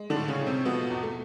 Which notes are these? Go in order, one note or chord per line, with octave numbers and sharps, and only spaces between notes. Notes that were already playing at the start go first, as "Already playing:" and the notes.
Already playing: G#3
D3 D4
A2
C#3 C#4
A2
C3 C4
B2 F3 B3
E2
A3